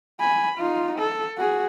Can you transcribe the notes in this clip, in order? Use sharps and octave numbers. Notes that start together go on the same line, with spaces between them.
G#5 B5
D#4 F4
A4
F#4 G#4